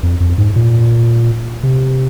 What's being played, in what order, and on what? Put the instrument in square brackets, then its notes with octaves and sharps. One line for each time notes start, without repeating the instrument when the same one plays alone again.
[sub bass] F2
F2
G#2
A#2
C3